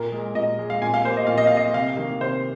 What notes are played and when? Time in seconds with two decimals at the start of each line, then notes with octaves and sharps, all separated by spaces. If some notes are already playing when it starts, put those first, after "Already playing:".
Already playing: A#2 A#4
0.12 G#3
0.35 A#2 D#5
0.59 G#3
0.70 F5
0.82 A#2 G#5
0.94 F5
1.05 A#3 C5
1.17 D#5
1.27 A#2 F5
1.38 D#5
1.47 A#3 F5
1.57 D#5
1.74 C3 F5
1.97 D#3 A#3
2.20 C3 C5